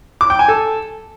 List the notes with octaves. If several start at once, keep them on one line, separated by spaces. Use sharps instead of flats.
D6
G5
G#5
A4